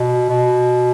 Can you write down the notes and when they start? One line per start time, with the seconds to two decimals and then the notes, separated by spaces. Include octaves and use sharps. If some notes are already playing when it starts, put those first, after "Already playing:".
Already playing: B2
0.29 B2